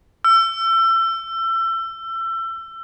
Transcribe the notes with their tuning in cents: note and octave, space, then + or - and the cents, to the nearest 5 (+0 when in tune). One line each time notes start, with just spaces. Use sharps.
E6 +30